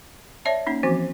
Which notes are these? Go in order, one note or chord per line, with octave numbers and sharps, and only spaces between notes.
C#5 D5 E5 A5
A#3 C#4 D#4
E3 F3 C4 F#4